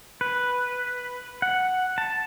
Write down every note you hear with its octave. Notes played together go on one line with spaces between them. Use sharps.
B4
F#5
A5